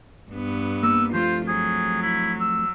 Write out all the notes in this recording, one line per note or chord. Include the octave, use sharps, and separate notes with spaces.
G2 B3
A#3 E6
F3 A3 C4 F4 C5
F#3 G#4
E4
E6